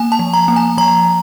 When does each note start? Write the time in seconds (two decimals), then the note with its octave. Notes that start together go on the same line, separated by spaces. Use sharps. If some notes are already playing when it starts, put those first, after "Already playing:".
Already playing: A#3 G#5
0.12 A5
0.19 F3
0.33 A#5
0.48 A#3
0.56 G#5
0.78 F3 A#5